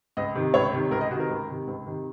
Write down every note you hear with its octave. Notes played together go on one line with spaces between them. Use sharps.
C#2 D#5
C3 D#3
C#2 C#5
C3 D#3
C#2 A#4
D#5
C3 D#3 F#4
A#4
C#2
C3 D#3
C#2
C3 D#3